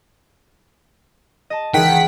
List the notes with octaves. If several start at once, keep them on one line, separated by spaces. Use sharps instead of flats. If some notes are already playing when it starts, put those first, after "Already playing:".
D#5 A5
C#2 D#3 E3 F#5 G5 B6